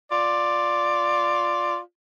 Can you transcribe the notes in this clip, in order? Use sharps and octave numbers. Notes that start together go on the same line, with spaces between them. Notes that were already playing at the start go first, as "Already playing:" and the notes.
F4 D5